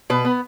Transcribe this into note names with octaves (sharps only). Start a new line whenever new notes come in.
B2 B4
B3